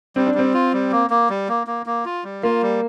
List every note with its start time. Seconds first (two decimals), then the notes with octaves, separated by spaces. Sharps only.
0.16 G3 C4
0.27 D4
0.34 G3 C4
0.54 F4
0.73 G3
0.92 A#3
1.10 A#3
1.30 G3
1.49 A#3
1.67 A#3
1.86 A#3
2.05 F4
2.24 G3
2.43 A#3 F4
2.62 G3